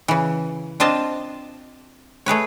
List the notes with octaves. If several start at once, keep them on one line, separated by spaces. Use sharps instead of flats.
C#3 E3
C4 D4 F4 D#5 A5
A3 G#4 B4 C#5